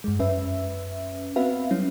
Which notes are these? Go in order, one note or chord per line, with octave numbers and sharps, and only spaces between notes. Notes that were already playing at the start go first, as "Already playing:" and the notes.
G2 G#3
F#2 C#4 B4 E5
B3 C4 F#4 B4 E5 F5
F#3 G3 C#4 E4